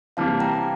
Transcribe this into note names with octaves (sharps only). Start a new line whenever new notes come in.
C3 E3 G3 A#3 F5 A5
G5 A#5